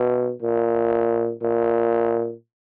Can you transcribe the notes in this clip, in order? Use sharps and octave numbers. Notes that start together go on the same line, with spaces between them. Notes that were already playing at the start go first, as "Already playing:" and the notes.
Already playing: B2
A#2
A#2